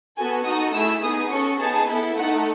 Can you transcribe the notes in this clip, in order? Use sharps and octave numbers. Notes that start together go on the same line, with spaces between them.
B3 F#4 A4 G#5
D#4 F#4 A4 D#6
A3 E4 G#4 E6
B3 D#4 G#4 D#6
C#4 F#4 A4 C#6
B3 D#4 G#4 A5
B3 E4 A4
A3 D#4 A4 F#5